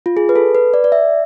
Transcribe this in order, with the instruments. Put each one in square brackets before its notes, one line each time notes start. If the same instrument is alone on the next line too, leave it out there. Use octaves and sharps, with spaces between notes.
[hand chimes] F4
G#4
B4
A4
B4
D5
D5
E5